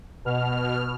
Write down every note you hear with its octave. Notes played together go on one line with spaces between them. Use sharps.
B2 F6